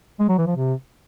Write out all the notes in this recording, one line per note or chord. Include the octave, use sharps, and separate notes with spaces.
G#3
F#3
E3
F3
C3